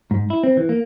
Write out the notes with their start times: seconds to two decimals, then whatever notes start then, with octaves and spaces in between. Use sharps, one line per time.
0.11 G#2
0.30 E4
0.43 C4
0.57 E3
0.69 A#3